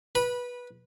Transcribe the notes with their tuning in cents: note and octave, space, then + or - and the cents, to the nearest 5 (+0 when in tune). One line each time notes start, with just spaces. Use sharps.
B4 -15 B5 -20